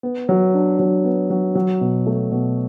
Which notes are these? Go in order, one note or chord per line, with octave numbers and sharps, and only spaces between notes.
B3
F#3
D4
F#3
B3
F#3
F#3
B2
A3
B2